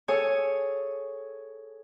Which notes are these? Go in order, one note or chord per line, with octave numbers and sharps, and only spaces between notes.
G#4 A4 C#5 G#5